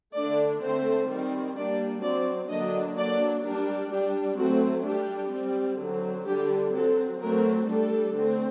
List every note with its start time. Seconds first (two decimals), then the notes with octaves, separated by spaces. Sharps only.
0.15 D3 A3 D4 D5
0.62 D3 A3 C4 C5
1.09 D#3 G3 C4
1.56 G3 A#3 D4 D5
2.03 F#3 C4 D5
2.50 D3 F#3 A#3 D4 D#5
2.98 F#3 A#3 D4 D5
3.45 G3 D4 A#4
3.91 G3 D4 G4
4.38 F#3 A3 C4 F#4
4.86 G3 D4 G4
5.33 G3 C4
5.80 D3 F#3 C4
6.27 D3 G3 D4 G4
6.74 F#3 C4 A4
7.21 F#3 A3 C4 A#4
7.68 G3 D4 A4
8.16 D3 A3 C4